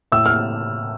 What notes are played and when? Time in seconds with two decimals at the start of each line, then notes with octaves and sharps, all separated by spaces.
0.12 A2 E6
0.26 F6